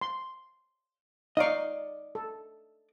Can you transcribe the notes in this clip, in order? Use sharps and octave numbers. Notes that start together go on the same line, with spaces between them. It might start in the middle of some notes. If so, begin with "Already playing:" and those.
C6
D#4 D5 D#5 F5 C#6
A4